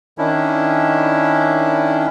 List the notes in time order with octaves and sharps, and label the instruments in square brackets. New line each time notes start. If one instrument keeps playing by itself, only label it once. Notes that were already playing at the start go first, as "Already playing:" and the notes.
[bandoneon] D#3 C#4 D4 E4